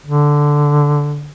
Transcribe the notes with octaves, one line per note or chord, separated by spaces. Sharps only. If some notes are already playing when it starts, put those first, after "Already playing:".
D3